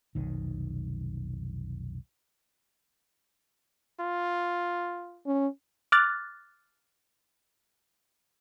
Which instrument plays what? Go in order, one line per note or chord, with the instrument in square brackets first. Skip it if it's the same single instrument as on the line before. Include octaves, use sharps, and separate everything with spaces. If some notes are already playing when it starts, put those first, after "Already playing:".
[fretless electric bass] F1 B1 D#3
[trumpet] F4
[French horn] C#4
[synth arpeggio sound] D6 F6 F#6 A6